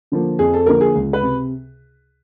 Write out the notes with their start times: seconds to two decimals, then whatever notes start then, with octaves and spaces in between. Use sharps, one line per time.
0.12 D3 F3 A#3
0.39 F2 G#4
0.54 A4
0.66 D3 F3 A#3 A#4
0.81 G#4
0.95 C#2
1.13 B4
1.23 C3